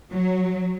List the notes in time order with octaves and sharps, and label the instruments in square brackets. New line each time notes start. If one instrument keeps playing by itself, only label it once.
[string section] F#3